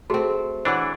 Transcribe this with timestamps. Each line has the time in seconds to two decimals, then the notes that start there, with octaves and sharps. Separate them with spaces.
0.10 A3 C4 F#4 G#4
0.65 E3 D4 C#5 F#5